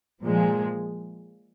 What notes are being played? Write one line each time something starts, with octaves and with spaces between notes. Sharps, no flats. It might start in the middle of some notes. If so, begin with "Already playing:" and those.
A#2 F3 G#3